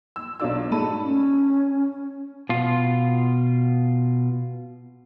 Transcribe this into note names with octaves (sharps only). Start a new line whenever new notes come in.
E6
B1 F#3 D4 F4 D5 E6
G#2 A3 D#4 A5 B5 D#7
C#4
B2 F4